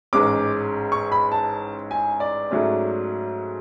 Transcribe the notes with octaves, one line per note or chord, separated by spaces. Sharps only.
A1 G#2 G#3 C#4 D6
C#6
B5
A5
G#5
D5
G#2 F#3 A3 C#4